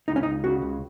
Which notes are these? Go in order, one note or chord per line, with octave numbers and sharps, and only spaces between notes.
C#2 D#4
C#4
D#4
C#2
C#3 F#4
C#2